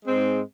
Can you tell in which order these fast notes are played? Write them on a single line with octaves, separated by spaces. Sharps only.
G#3 C4 G#2